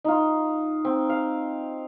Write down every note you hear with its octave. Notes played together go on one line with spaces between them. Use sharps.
D#4 F4
C4
F5